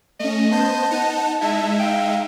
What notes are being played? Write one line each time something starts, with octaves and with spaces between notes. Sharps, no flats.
A3 C#4 D#5
B3 C5 A5 G6
D#4 F#5
G#3 D#4 E4 E5
F5 G5